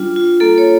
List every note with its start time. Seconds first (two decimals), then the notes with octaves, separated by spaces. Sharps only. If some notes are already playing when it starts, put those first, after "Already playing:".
Already playing: G3 D4 F4
0.16 F4
0.40 A#3 A4
0.58 C#5